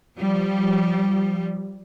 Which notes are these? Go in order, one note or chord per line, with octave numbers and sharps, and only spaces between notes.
F3 G3